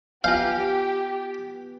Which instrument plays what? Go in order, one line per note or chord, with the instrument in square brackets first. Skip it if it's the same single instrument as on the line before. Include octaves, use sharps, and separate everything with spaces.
[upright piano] B3 [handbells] F4 G#5 G6 [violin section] G4 [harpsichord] F5